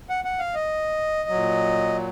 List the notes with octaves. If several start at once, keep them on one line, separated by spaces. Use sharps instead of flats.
F#5
F#5
F5
D#5
F#3
A#2